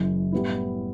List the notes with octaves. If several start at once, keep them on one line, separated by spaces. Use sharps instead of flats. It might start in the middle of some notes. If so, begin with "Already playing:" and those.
Already playing: F#1 F#2 E3
A2 G3 B3 E4